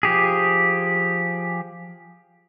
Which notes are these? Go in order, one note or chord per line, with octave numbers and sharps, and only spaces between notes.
F3 G4 G#4